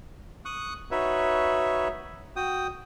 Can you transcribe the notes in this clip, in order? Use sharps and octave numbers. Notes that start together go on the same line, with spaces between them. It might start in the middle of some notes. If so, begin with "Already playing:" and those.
C#6 D#6 F#6
D#4 F#4 B4 C#5 E5
F#4 G5 D#6